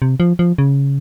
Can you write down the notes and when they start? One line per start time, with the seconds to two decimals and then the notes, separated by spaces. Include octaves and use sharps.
0.02 C3
0.20 F3
0.39 F3
0.58 C#3